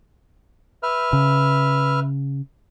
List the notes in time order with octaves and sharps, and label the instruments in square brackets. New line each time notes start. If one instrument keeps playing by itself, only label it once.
[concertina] B4 E5 F6
[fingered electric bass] C#3